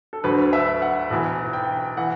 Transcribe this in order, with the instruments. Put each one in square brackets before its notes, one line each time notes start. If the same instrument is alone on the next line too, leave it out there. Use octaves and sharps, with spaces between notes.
[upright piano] A4
D2 D3 F#3 B4
E5
F#5
B1 A2 E3
G5
E3 F#5